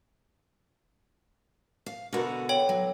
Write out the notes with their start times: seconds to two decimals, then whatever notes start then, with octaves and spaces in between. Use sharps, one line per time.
1.86 F5
2.13 B2 D3 B3 F#4 A#4
2.49 C#5 G5 F#7
2.69 F#3